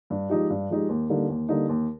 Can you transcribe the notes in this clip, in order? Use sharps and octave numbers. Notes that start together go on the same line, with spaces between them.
G2
F3 G#3 D#4 G4
G2
F3 G#3 D#4 G4
D#2
D3 G3 A#3 D#4
D#2
D3 G3 A#3 D#4
D#2